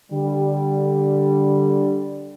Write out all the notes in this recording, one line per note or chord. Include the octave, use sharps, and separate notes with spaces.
D3 G3